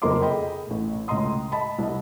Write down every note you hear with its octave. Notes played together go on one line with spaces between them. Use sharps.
F#1 F2 A#3 D#5 C6 D6
G#4 A4 D#5 G5 B5
A1 A2
C#2 A2 D#5 A#5 C6 D#6
D#5 A5 B5
C2 D#5